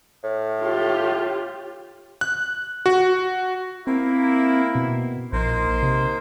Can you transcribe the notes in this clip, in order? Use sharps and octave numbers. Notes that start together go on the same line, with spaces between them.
A2
F4 G4
F#6
F#4
A#3 C4 E4
B2
A#1 A#3 D#4 C5
C3